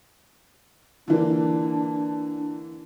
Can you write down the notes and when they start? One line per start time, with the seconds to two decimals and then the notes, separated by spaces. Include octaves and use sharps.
1.08 D3 E3 A#3 D4